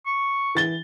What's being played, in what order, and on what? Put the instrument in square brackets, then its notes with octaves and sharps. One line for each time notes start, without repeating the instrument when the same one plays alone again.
[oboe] C#6
[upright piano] E3 A6 G7